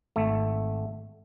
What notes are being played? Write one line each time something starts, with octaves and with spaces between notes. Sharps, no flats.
G#1 A3